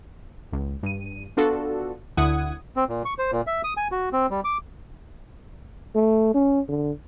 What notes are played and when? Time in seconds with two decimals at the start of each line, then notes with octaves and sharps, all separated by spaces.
0.52 C#2
0.83 G2 D#7
1.37 B3 D4 F4 F#4 A4
2.17 D2 D3 E4 F#5 D#6 G#6
2.77 C4
2.89 A#2
3.05 C#6
3.19 C5
3.32 A#2
3.47 E5
3.64 D#6
3.77 G#5
3.92 F#4
4.13 C4
4.31 G3
4.44 D6
5.96 A3
6.34 C#4
6.69 D3